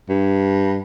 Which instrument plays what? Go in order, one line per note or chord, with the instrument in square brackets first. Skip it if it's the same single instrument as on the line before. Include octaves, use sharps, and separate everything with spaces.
[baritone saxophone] G2